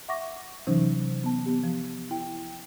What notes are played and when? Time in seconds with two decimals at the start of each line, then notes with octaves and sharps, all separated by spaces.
0.09 E5 F#5 C#6 D6 A#6
0.67 C3 E3 F#3 C#4 D#4 C5
1.24 B3 A5
1.46 B3 G4
1.63 F3
2.10 E4 G5